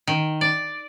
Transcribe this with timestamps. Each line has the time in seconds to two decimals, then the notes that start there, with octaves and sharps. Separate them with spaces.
0.07 D#3
0.41 D5